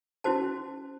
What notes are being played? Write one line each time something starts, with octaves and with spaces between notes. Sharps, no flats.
C#4 E4 F#4 C5 A5